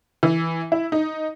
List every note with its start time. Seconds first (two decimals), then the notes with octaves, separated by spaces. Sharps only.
0.23 E3
0.72 E4
0.92 D#4